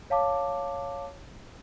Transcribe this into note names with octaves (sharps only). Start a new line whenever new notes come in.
C#5 F5 A5 D6